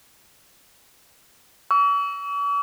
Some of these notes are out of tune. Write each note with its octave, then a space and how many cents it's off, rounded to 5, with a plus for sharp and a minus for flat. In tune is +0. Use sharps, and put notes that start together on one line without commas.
C#6 +45 E6 +0